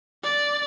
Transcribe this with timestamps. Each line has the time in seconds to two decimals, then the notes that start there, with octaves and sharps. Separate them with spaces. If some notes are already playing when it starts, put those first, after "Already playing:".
0.23 D5